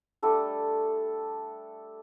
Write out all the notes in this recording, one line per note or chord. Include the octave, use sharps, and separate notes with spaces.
G3 A3 D4 A4